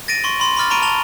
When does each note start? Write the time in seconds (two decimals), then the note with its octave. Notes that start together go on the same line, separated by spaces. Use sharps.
0.08 A6 A#6 D7 D#7
0.24 C6 C#6 A#6
0.40 B5 C6
0.56 B5 C6 D6 F6 A6
0.70 A#5 B5 C#6 D7 D#7
0.82 A5 F7 G7